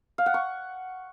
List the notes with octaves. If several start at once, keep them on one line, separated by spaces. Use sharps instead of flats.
F5
F#5
C#6